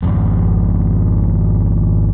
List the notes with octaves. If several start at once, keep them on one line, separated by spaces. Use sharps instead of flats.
G#1 F2